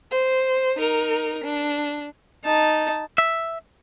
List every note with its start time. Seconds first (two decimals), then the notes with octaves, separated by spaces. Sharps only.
0.11 C5
0.77 D#4 A#4
1.43 D4
2.45 D#4 A5
3.18 E5